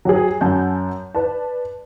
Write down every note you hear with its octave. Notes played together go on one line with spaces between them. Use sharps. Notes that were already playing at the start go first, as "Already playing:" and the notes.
F#3 G4 G#4
F#2 F#5 G#5 A5 G6
B4 D5 A5